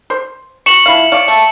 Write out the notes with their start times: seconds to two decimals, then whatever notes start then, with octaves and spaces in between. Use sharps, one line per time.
0.10 C5
0.66 C#6 C#7 E7 F#7
0.86 F3 E4 F5
1.12 C#5 D5 F5
1.28 A3